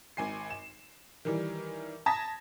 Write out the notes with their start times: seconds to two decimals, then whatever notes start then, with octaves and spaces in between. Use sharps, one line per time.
0.17 G#1 G#5 C7
0.50 E7
1.25 D#3 E3 G3
2.06 A5 D#6 G#6 A#6 B6